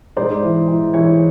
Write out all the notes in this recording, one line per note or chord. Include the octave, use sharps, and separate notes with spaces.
G#2 C5 D5
E3
E3
E3 C#5